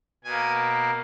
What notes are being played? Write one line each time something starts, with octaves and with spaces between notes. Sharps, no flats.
B2 A#3 G#5